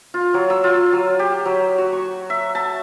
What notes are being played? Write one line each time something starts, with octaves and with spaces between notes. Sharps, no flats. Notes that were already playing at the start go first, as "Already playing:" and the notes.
F4
F#3
E6
F4
F#3
G4
F#3
F#4
C#6
E5
A5